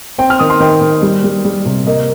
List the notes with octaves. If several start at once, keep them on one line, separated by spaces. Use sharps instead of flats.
C4 G5
F6
D#3 D#6
C6
D#3 G5
D#3
G3
G3
G3
C3
A#3 D#5